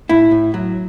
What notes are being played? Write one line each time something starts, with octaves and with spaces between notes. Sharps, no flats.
A2 E4
A2
F#3